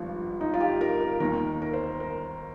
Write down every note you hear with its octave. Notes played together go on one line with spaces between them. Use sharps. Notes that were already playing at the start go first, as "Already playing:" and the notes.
Already playing: G#1 G2 F3
D#4
F4
G4
A#4
A#4
D#2 D#3 A#4
A#4
C5
A#4